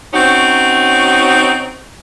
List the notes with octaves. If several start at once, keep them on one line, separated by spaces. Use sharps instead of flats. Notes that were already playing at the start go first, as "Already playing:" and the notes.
C4 C#4 D#4 F#4